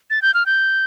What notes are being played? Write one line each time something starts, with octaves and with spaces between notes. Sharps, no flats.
A6
G6
F6
G6